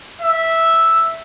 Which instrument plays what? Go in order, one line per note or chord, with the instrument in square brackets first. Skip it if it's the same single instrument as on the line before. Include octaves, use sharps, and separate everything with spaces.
[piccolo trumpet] E5